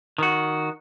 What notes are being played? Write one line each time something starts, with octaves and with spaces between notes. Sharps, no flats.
D#3 F#4